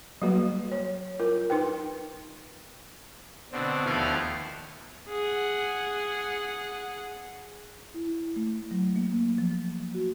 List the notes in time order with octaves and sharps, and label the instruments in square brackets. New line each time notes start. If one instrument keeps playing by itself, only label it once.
[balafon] F#3 G3 A#3 F#4 B4
C#5
F4 A#4
D#4 B4 G5
[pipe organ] B2 D3 C4
D#2 F3 A3 B3 E4 F5
[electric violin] G#4 F#5
[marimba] E4
A3
F#3
A#3
F3
F#4